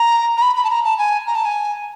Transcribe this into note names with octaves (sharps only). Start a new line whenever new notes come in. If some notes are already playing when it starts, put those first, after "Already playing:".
Already playing: A#5
A#5
B5
B5
A5
A#5
A5
G#5
A#5
A5
G#5